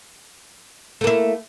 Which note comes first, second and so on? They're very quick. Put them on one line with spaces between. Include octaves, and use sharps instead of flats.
A3 A#3 E4